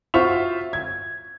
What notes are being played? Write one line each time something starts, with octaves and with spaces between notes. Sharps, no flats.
F4 F#4 C5 E5 C#6 F7
G#6